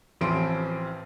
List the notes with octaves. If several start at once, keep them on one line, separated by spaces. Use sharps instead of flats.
A1 E3 F3 C4 C6 D7